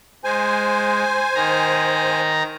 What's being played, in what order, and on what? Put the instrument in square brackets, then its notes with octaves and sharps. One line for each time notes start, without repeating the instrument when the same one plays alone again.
[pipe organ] G#3 [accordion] C5 G#5
[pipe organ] D#3 A#5